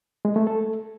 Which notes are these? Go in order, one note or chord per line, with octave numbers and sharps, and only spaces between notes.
G#3
A3
A4